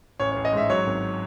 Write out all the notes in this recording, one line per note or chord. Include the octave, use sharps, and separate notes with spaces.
A1 C#5
A1 C#5
D#5
G#2 E5
F#3 C#5
G#1